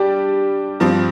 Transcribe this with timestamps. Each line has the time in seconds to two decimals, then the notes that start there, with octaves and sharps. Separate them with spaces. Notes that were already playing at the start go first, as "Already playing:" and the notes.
Already playing: G3 D4 G4
0.80 G2 F3 C4